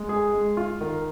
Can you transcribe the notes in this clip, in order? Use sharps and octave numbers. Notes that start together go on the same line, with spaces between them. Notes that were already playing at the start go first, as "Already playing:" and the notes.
Already playing: G#3
G#4
G#3
F4
D#3